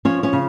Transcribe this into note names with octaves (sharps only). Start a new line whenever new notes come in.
F3 C#4 C#5
C#4 C#5
C#3